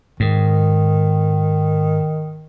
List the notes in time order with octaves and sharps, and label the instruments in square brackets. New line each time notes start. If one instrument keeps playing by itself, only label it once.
[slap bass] G#2 [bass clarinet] D#3